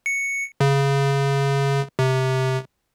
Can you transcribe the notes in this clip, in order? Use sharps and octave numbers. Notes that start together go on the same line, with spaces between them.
C#7
C#3
C3